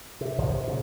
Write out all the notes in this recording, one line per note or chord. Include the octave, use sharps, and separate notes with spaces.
C3
G#1 C#2 A2 F3
C3
A#2 C#3